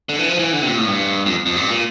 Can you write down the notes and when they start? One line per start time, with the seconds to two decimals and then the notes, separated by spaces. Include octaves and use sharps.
0.09 D3
0.19 E3
0.29 F3
0.39 E3
0.53 D3
0.62 C3
0.67 A#2
0.78 A2
0.87 G2
1.26 F2
1.46 F2
1.56 G2
1.70 A#2